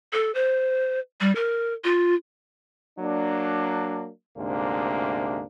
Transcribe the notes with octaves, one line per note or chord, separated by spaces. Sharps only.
A4
C5
G3
A#4
F4
F#3 A#3 D4
D2 G#2 C3 A#3 D4